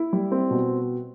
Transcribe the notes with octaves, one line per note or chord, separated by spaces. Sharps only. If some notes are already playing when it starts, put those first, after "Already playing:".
Already playing: E4
G3
C4
B2